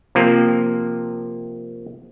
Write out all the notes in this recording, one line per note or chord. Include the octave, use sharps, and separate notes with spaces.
C3 F3 A#3 C4